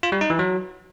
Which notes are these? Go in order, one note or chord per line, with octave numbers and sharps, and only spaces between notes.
F4
G3
D#4
E3
F#3